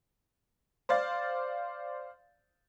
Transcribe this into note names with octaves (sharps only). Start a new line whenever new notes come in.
C5 D5 F5 A6